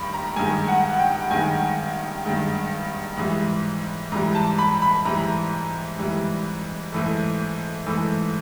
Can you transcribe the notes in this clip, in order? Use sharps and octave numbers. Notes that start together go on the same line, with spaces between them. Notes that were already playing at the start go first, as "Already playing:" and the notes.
Already playing: G2 D#3 B5
A#5
G2 D#3 G#3 G#5
F#5
G5
G2 D#3 G#3 G#5
G2 D#3 G#3
G#2 E3 G3
G#2 E3 G3 A#5
A5
B5
B5
G#2 E3 G3 A#5
G#2 E3 G3
G#2 E3 A3
G#2 E3 A3